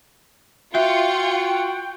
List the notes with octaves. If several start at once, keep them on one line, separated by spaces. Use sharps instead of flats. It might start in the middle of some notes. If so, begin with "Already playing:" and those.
F4 F#4 E5 G5 C#7